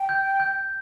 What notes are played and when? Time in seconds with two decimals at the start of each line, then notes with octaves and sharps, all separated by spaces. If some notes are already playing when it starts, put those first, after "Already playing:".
Already playing: G5
0.09 G6
0.40 G6